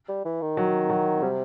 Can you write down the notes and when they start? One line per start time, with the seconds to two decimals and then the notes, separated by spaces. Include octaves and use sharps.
0.09 G3
0.25 E3
0.42 D#3
0.57 F#3
0.89 F#3
1.22 C3 G3